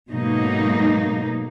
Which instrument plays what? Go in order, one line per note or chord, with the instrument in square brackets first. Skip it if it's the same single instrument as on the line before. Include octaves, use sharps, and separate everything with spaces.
[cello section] G#2 B2 F#3 A3 A#3 D#4